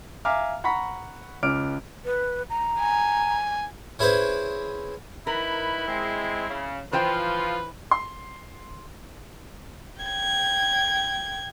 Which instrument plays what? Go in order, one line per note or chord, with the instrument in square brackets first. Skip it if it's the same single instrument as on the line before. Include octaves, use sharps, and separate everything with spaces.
[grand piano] E5 F5 G#5 A#5 D6 F6
F#5 A#5 B5 C#6 B6
C#2 C#4 D6 F6 D7
[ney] B4
A#5
[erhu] G#5
[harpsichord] C#4 E4 G#4 B4 C5
[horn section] D#3 B4 B5 [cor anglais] E4 [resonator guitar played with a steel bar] A#4
[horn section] G#3 C4
C#3
[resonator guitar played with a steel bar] E3 C5 G5 [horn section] F3 F4 [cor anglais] B4
[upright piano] C6
[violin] G5 G#6